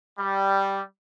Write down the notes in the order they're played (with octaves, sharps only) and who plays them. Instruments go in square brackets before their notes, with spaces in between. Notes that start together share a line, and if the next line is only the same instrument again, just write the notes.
[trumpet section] G3